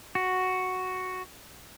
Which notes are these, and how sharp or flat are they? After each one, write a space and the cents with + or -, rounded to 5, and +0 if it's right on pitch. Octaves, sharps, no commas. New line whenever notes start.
F#4 +0